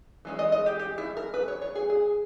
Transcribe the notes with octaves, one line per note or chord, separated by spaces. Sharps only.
E3 G#3 C#4
D#5
D#5
G4
G4
E4
A#4
B4
C#5
C#5
G#4
G#4